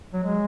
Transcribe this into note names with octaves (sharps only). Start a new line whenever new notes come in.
F#3
G#3